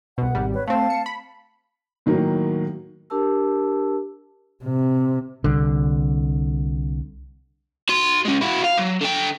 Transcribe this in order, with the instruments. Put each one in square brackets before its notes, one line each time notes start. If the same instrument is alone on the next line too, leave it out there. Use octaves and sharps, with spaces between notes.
[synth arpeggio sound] C2 B2 [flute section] F#5
[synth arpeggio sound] G#1 G3
[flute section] B4 C#5
[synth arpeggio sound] A3 C4 [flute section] F5 A5
[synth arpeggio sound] C#7
B5
[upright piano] A2 D#3 F#3 A#3
[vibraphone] D4 G4 A#4 A5 E6
[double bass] C3
[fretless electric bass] C2 D3
[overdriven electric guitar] F#4 C6
G#3 C#4
E4 F#4
F5
F#3
D3 G5